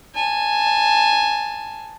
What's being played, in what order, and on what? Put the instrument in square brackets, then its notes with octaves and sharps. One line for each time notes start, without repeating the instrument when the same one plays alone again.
[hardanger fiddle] G#5 A5